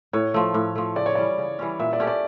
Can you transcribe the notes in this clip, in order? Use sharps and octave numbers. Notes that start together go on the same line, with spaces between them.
A2 C#5
F3 A3
A2
F3 A3
C#3 D5
C#5
E3 G3 C#4 D5
C#3
E3 G3 C#4
A#2 E5
D5
A3 C#4 G4
D5